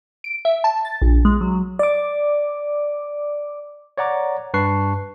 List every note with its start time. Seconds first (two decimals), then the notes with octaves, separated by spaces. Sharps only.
0.24 D7
0.45 E5
0.64 A5
0.85 A6
1.02 A#1
1.25 G#3
1.41 F#3
1.79 D5 D6
3.97 C#5 D5 F#5 A#5 D6
4.54 G2 B4 A5 C#6 F#6 C7